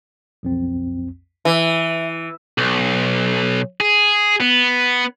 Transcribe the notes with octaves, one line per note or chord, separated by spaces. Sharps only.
B1 F2 C4
E3 E5
B1
G#4
B3